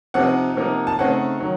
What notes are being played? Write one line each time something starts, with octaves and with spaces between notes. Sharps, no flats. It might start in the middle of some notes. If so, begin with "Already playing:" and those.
C3 F3 C4 D#4 F#5
C3 F3 A#3 D#4
A5
C#3 A3 C4 D#4 F#5
D#3 F#3